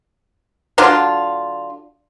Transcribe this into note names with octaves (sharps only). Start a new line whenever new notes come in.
D3 F#3 D4 F4